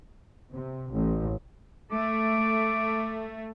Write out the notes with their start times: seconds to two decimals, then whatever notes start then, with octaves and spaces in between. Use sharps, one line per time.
0.51 C3
0.92 A1
1.91 A3 D6